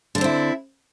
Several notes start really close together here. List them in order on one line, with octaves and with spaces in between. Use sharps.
D3 D4 C4 E4